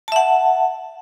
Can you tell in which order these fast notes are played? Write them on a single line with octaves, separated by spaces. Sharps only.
A5 E5 F#5